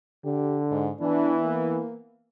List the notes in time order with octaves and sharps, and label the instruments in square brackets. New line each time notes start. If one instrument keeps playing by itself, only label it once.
[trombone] D3 [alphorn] G4
[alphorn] G#2
[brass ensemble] E3 [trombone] B3 [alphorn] D4
[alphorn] A#3